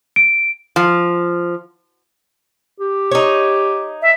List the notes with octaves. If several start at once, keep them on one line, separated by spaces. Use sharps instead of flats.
D7
F3
G4
D#4 C#5
E5